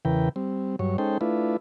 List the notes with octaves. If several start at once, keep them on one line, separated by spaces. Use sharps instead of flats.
E2 C#3 E3 A#4 B4 G5
G3 C4
G2 F#3 C#5
G#3 C#4 D#4 A4 C5 G5
A3 D4 E4 F4 B4